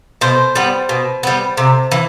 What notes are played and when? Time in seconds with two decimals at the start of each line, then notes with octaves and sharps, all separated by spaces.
0.21 B2 C5
0.55 G3 B3
0.89 B2
1.23 G3 B3
1.57 C3
1.91 E3